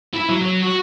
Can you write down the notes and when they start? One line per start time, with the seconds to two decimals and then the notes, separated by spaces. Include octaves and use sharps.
0.14 E4
0.29 F#3
0.42 F#3
0.62 F#4